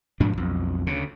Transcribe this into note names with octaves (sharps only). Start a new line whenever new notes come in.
G#2 F3 D4
B1 F2
D2 C#3